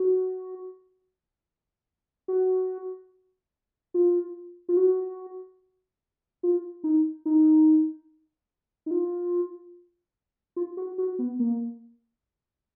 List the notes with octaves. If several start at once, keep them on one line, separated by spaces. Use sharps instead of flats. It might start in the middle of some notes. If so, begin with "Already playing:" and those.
Already playing: F#4
F#4
F4
F4
F#4
F4
D#4
D#4
D#4
F4
F4
F#4
F#4
B3
A#3